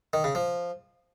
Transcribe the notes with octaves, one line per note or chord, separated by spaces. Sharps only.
D#3
C#3
F3